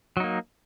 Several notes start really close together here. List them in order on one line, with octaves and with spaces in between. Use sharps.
F#3 D#4 A#3